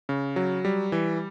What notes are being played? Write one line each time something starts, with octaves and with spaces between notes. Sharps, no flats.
C#3
F#3
G3
E3